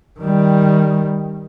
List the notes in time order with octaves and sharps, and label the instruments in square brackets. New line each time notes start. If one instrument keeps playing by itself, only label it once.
[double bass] D#3 G3